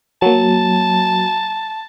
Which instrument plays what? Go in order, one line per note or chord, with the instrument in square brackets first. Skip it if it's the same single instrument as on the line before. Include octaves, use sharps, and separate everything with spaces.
[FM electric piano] F#3 A#3 [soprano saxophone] A5